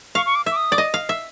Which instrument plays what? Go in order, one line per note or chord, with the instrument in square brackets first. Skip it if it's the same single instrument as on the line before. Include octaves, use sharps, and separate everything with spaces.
[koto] F5 [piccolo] C#6
[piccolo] C#6
D6
[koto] E5
[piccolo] D6
D#6
[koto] D5
D#5
F5
E5